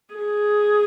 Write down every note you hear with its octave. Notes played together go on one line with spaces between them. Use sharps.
G#4